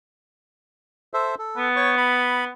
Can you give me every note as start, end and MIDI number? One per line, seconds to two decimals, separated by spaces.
1.14 1.35 69
1.14 1.35 72
1.14 1.35 76
1.39 1.69 69
1.57 2.49 59
1.76 1.95 73
1.76 1.95 85
1.97 2.45 83